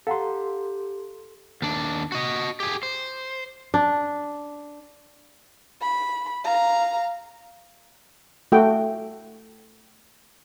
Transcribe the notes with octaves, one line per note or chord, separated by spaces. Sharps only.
G4 A4 F5 F#5 A#5 C6
D#2 D4
F#4 D#5
G4 G#4
C5
D4
B5
F5 A#5
A3 F#4 G5